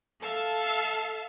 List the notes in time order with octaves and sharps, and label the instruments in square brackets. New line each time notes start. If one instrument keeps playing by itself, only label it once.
[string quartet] A4 E5 F5 A5